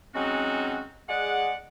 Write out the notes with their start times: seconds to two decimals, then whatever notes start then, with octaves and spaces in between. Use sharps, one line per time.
0.14 F#3 G#3 C4 C#4 D#4 F#4
1.08 G#3 G#4 D5 F#5